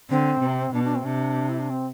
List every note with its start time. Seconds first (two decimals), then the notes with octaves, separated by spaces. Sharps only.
0.10 D3 C4
0.41 C3
0.74 B2 D4
0.84 D4
0.95 C4
1.05 C3 D4
1.49 E4
1.59 D4
1.70 C4